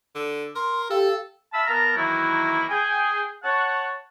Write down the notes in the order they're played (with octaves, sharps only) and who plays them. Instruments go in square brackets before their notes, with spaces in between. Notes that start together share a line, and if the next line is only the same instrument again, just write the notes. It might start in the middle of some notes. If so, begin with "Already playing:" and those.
[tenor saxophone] D3
[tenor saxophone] A#4 [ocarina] C6
[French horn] G4 [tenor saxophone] A4 [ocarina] F5
[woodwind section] E5 F5 A5 B5 E6
B3 A#4 F5 A5 A#5
D#3 E3 F#3 A#3 E4
G#4 G5 G#5
C#5 F#5 A5